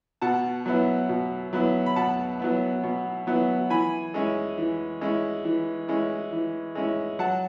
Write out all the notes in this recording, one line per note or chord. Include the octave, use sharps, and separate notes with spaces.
B2 F#5 A5
F#3 B3 E4
B2
F#3 B3 E4
B5
B2 F#5 A5
F#3 B3 E4
B2
F#3 B3 E4
E3 G#5 B5
G#3 C#4 E4
E3
G#3 C#4 E4
E3
G#3 C#4 E4
E3
G#3 C#4 E4
F#3 F#5 A5